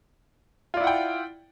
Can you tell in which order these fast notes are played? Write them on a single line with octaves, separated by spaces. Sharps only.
F4 D5 E4 F#5 G5